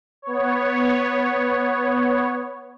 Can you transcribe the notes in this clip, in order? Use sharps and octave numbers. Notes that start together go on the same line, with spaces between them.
B3 C#5